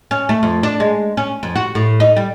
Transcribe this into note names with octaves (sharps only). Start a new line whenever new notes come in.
C#4
A3
F2
D4
G#3
C#4
F2
F#4
A2
D#4
G3